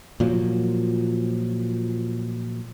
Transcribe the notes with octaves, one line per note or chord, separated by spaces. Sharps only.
A#2 F3 F#3